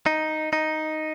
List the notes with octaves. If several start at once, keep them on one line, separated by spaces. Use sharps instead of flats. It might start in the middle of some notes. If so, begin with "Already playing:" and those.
D#4
D#4